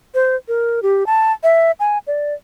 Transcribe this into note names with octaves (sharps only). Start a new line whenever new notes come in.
C5
A#4
G4
A5
E5
G#5
D5